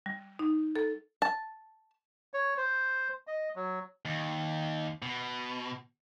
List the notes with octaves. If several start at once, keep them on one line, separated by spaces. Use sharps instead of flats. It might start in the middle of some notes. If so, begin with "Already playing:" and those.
G3
D#4
A4
A5
C#5
C5
D#5
F#3
D#2
B2